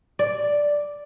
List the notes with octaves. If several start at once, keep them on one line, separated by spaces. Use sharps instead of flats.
D5